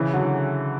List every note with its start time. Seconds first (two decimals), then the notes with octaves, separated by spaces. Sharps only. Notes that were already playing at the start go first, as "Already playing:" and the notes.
Already playing: C#3 E3
0.13 D3 F#3